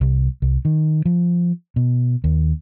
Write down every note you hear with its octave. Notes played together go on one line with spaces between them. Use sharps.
C2
C2
D#3
F3
B2
D#2